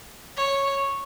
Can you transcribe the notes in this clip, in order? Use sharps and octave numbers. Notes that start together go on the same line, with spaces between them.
C#5